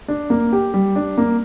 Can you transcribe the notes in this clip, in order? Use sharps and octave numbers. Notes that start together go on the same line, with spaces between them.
D4
A#3
G4
G3
D4
A#3